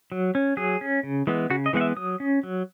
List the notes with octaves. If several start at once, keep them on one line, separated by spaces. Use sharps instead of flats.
F#3
C#4
F#3 G#4
C#4
C#3
E3 G#3 B3
C#3 F#4
D#5
E3 G#3 B3 F#5
E5
F#3 D#6
C#4
F#3